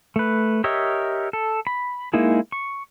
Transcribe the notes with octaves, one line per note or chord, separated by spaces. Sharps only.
A3 B4
G4 A#4 C#5 D#5 E5
A4
B5
G#3 A#3 D#4 E4 G#4
C#6